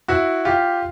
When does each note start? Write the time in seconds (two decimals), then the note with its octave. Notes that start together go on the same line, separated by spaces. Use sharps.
0.08 E4 F#4
0.45 F4 G4